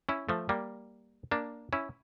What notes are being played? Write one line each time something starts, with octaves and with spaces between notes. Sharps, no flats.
C#4 E4
F3 A3
G3 A#3
A#3 D4
C#4 E4